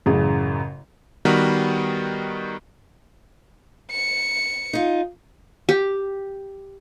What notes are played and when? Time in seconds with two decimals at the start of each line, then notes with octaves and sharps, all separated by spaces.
0.06 A1 F#2 C#3 G#4
1.25 D#3 G3 B3 F#4 A#4 B4
3.92 C#7
4.73 D#4 F4
5.69 G4